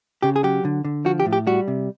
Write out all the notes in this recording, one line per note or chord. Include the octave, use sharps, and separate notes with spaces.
C#3 G4
G#4
F#3 G4
D3
D3
F3 F#4
G4
A2
G4
G3 F#4
C3